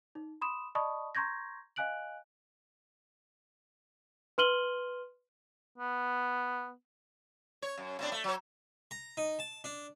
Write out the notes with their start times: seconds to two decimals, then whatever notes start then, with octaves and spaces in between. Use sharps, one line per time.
0.15 D#4
0.41 B5 C6 D#6 E7
0.75 D5 D#5 A5 B5 C#6 D#6
1.15 A#5 C6 C#6 G6 G#6 A#6
1.76 D#5 F5 G#5 F#6 D7 F#7
4.38 B4 C6 F6 D#7 F#7 G7
5.78 B3
7.62 C#5
7.78 F#2
7.99 A2 C4 D4
8.12 A3
8.24 F#3 C#5
8.91 A#5
9.17 D#4
9.39 A5
9.64 D4